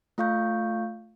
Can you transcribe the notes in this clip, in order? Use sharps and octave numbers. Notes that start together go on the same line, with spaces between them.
A3 F4 F5 C#6 G6